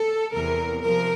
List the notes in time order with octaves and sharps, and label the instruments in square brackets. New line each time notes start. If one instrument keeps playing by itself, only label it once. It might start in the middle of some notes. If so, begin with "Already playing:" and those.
Already playing: [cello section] A4
E2 C3 E3 A#4
C3 F3 A#4